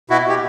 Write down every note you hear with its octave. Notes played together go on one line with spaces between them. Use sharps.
B2 E4 F#4
B2 G4